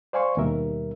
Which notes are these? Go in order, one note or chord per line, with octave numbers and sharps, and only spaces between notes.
C5 D5 F5 G#5 C6 C#6
D#2 B2 G3 A#4 E5